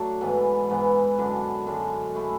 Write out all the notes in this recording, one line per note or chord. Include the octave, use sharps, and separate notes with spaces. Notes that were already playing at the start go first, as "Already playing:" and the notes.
Already playing: F#3 A3 D4
G#2 E3 B3
G#2 E3 B3
F#2 D3 G#3 D4
F#2 D3 G#3 D4
A3 E4 G#4